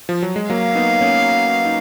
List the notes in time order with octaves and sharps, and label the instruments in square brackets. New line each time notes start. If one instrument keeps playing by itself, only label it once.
[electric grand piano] F3
F#3
G#3
[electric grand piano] F#3 A#3 [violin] F5
[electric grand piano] B3 D#4
A#3 C#4
D#4